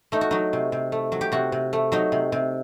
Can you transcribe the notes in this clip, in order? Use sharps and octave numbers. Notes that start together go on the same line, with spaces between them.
A3 D#4
F#4
F#3 D#4
C3
C3
A3
F#3
G4
C3 F#4
C3
A3
F#3 D#4
C3
C3